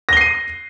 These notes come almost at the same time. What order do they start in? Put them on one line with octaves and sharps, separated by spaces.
A#6 G7 C7 D#7